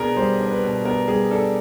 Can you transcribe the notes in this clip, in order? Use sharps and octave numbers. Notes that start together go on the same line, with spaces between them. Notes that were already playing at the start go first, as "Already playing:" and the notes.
Already playing: B2 B3 D4 G#4 A#4 B4
G3 C5
D4
B4
B2
B3 A#4
G3 G#4
D4 A4